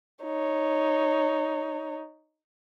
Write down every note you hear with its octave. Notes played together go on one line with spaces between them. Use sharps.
D#4 C#5